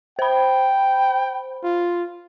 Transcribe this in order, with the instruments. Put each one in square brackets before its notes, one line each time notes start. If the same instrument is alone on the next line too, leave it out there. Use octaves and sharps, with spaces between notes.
[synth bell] C5 B5 [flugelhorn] G5
[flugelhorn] F4